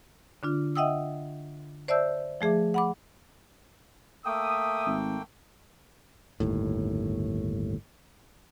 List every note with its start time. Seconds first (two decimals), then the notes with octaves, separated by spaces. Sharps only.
0.43 D3 D4 F4
0.75 D#5 E5 F#5 G5 D#6 E6
1.88 C5 D5 E5 A5 E6 G6
2.41 F3 A3 G#4 E5 D6
2.74 F#5 B5 D6
4.25 A3 A#3 E5 G5 D#6
4.86 G#1
6.40 G1 D#2 A2